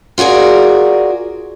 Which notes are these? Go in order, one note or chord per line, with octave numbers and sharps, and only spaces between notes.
F4 F#4 G#4 A#4 D5